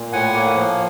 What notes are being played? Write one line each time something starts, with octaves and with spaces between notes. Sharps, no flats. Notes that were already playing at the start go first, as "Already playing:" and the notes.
Already playing: A#2
A2 F#5 G#5
A#3
F3